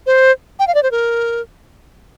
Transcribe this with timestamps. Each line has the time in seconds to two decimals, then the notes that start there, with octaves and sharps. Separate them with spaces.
0.06 C5
0.59 G5
0.67 F5
0.75 D5
0.83 C5
0.91 A#4